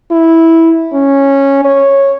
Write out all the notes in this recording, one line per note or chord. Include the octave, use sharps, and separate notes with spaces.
E4
C#4
C#5